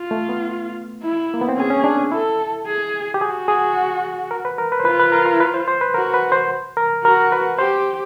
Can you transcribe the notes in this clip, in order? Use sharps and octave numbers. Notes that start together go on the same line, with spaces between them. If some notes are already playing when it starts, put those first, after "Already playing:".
Already playing: F4
A3
B3
E4
A#3
B3
C4
C#4 G#4
C#4
D4
E4 A4
G#4
G4
F#4 G#4
G#4
A#4
B4
A#4
B4
C5
F4 B4
B4
A#4
A#4
B4
C5
C5
B4
F#4 A#4
B4
C5
A#4
F#4 A#4
B4
G4 C5